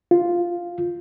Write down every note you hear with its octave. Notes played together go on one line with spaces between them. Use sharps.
F4